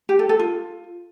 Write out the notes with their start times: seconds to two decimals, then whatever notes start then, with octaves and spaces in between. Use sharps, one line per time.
0.09 G4
0.19 A4
0.29 A4
0.39 F4